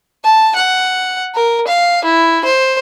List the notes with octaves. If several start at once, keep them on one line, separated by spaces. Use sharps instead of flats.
A5
F#5
A#4
F5
E4
C5